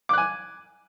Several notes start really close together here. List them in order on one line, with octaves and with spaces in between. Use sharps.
D6 F#6 G#5